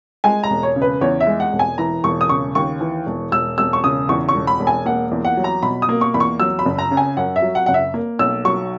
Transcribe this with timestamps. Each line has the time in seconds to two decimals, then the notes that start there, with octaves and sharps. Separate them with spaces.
0.24 G#3 G#5
0.43 A#5
0.50 E1
0.63 C#5
0.76 C#3
0.82 B4
1.01 E2 C#5
1.20 E5
1.27 G#3
1.40 F#5
1.53 E1
1.59 G#5
1.78 E3 A#5
2.04 E1 C#6
2.21 D#6
2.29 C#3 C#6
2.55 D#2 C#6
2.81 E3
3.06 E1
3.32 E1 E6
3.58 E1 E6
3.73 C#6
3.84 C#3 D#6
4.09 E2 C#6
4.29 C#6
4.35 E1
4.47 B5
4.60 E1
4.67 G#5
4.86 A#3 F#5
5.11 E2
5.25 F#5
5.37 F#3
5.44 A#5
5.63 B2 B5
5.82 D#6
5.89 A#3
6.01 C#6
6.14 E2 B5
6.20 C#6
6.40 F#3 E6
6.59 B5
6.65 F#1
6.78 A#5
6.91 C#3
6.97 G#5
7.17 F#2 F#5
7.36 E5
7.42 F#3
7.55 F#5
7.66 F#1 F#5
7.74 E5
7.94 A#3
8.19 B1 E6
8.45 F#3 C#6